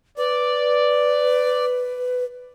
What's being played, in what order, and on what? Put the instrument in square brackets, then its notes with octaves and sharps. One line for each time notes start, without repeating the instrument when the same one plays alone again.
[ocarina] B4 [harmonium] D5